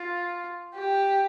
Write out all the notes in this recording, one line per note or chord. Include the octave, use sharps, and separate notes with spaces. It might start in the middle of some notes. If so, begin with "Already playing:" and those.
Already playing: F4
G4